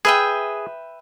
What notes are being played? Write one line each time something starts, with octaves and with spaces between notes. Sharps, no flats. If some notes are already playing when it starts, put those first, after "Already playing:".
G#4 B4 E5 G5